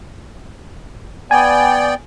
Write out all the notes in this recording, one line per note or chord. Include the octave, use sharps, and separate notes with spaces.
B3 D5 G5 G#5